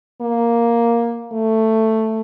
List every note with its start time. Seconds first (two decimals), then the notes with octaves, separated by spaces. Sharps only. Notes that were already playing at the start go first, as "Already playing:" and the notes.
0.21 A#3
1.32 A3